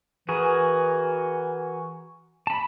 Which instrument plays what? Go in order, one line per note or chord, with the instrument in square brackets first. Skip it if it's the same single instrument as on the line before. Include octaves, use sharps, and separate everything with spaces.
[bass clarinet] E3 [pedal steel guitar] F#4 G#4 A#4
[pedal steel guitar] A5 B5